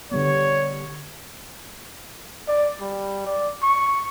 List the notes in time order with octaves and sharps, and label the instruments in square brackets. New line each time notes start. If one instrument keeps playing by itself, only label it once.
[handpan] D3 G3 B3 [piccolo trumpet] C#5
[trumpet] D5
G3
D5
C#6